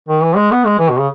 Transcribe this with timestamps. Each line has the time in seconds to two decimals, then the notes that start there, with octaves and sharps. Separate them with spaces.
0.09 D#3
0.23 E3
0.36 G#3
0.52 B3
0.65 G#3
0.79 E3
0.89 B2
0.99 C#3